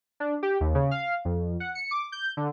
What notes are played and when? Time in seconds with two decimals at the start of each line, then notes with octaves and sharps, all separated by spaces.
0.20 D4
0.43 G4
0.61 D#2
0.75 C#3
0.91 F5
1.25 F2
1.60 F#5
1.75 C#7
1.91 D6
2.12 G6
2.37 D3